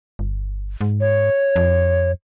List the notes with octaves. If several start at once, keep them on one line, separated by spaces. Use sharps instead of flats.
G1
G#2
C#5
F2